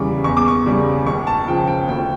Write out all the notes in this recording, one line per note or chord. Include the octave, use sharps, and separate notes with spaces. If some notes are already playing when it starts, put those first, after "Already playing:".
Already playing: E2 C#3 E3 G3 C#6 D6
E2 C#6
D6
C#6
C#3 G3
C#2 C#6
A5
C#3 F3 G5
G5
D2 G5